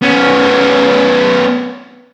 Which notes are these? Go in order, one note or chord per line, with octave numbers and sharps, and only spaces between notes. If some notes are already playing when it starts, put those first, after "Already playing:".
B3 C#4